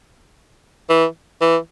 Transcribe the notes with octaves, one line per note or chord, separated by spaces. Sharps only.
E3
E3